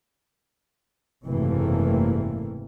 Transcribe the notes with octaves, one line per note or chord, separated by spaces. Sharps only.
F#1 G#2 C3 E3 A3 A#3